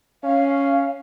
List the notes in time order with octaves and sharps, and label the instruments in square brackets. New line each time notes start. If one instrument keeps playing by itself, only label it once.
[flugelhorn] C#4 [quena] F5